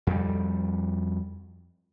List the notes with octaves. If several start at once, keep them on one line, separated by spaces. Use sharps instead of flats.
F2 G3